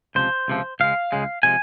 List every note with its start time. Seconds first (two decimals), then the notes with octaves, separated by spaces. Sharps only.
0.15 C#2 C3 F3 C5
0.48 C#2 C3 F3
0.80 C#2 C#3 G#3 F5
1.12 C#2 C#3 G#3
1.43 C3 F3 G#3 G#5